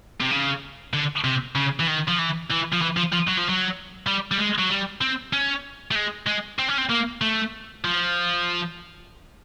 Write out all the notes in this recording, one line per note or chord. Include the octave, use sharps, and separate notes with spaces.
C3
C#3
D3
C3
C#3
E3
D#3
F3
E3
E3
F3
E3
F3
F3
F#3
F3
F#3
G3
G3
G#3
F#3
G3
C4
C#4
A3
G#3
G#3
C4
C#4
C4
A#3
A3
F3